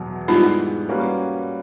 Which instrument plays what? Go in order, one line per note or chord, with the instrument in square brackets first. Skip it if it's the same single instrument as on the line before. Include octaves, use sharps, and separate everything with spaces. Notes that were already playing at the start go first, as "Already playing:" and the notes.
Already playing: [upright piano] E2 B2 F#3
[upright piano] G#2 E3 G3 B3 [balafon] D#4 F4
[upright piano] G3 A#3 C#4 F#4 B4